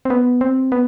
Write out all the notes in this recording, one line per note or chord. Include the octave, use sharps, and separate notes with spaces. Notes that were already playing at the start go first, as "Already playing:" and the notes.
C4
B3
C4
B3